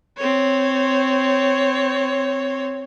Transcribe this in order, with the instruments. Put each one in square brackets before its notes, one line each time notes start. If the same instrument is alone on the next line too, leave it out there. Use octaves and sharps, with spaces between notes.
[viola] C4 C#5